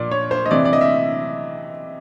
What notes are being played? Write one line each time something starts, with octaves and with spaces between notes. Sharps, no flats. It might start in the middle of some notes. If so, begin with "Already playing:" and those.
Already playing: A#2 F3 D5
C#5
C5
D#5
C3 E3 D5
D5
D#5
E5